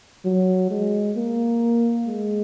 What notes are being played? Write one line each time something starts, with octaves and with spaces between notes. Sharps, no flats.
F#3
G#3
A#3
G#3